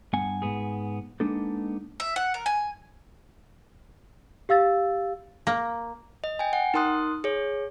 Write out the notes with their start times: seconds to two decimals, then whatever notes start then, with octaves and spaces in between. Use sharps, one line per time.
0.13 G2 B3 F#5 G#5
0.42 G#2 B3 G#4
1.20 G#3 A#3 B3 D4 D#4 A4
2.00 E5
2.16 F#5
2.34 A#4
2.46 G#5
4.49 G4 F5 E6 A6
5.47 A#3
6.24 D#5
6.39 G5 G#5
6.53 F#5
6.74 D#4 A#4 C6 D#6 F#6
7.24 G#4 C#5